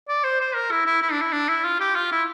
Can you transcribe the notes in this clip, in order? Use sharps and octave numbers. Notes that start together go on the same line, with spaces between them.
D5
C5
C5
A#4
E4
E4
E4
D4
E4
D4
E4
F4
G4
F4
E4